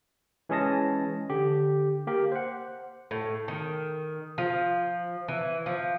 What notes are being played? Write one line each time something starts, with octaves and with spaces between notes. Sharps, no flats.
E3 G#3 C#4 G#4 A5 A#6
D3 G4
A#3 G4 A#4
C5 F#5
A2
D#3
F3
E3
F3